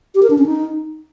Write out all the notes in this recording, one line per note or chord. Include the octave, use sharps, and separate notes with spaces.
G4
A#4
D4
C#4
D#4